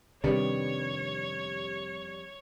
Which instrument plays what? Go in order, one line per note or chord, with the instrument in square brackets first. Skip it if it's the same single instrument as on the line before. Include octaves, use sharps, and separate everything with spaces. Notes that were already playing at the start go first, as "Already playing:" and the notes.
[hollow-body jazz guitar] F2 B3 D4 [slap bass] C3 D#3 [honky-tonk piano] G3 [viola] C#5